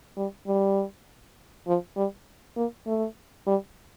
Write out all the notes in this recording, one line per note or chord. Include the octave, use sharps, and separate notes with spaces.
G3
G3
F3
G3
A#3
A3
G3